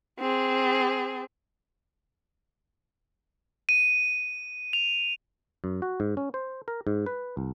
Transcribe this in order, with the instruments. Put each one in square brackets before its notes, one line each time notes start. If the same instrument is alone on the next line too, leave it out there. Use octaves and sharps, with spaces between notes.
[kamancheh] C4 G#4
[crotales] D#7
F7
[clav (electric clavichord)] F#2
F#4
G#2
C#4
C5
A#4
G#2
B4
C2